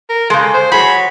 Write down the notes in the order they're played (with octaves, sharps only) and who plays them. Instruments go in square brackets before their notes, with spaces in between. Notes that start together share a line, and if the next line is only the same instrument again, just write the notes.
[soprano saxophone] A#4
[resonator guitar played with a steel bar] C#3 G#3 [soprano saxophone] A4
[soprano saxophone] C5
[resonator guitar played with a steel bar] F#3 G#4 [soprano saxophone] B5